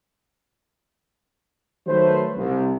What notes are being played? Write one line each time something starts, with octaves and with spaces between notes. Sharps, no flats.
D#3 F#3 A3 B4 C5
C2